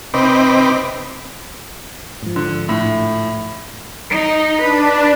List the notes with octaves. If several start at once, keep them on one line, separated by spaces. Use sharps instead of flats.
C3 C4 D#4 B4 D6
G#2 F3
D3
A2
D#4
D4 B4